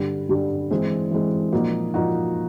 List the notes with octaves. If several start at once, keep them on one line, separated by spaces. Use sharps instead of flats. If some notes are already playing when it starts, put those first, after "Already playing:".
Already playing: G2 D3 G3
G2 D3 G3
E3 G#3 C4
E3 G#3 C4
A#2 F3 A#3 D#4 F#4
A#2 F3 A#3 D#4 F#4